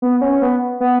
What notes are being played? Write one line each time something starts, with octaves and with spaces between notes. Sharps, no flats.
B3
C#4
B3
B3